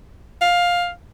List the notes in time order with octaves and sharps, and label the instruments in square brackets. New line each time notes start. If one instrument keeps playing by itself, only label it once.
[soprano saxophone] F5